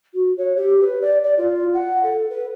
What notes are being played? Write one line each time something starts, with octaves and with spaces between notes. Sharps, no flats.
F#4
C#5
G4
B4
D5
D5
F4
F#5
A4
B4